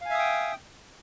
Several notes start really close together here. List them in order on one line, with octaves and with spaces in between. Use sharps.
F5 G#5 E5 D#6 G5